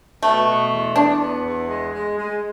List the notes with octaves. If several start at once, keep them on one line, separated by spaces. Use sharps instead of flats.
B2 A3
B2
E2
E2 D4
B3
E2
G#3
G#3
G#3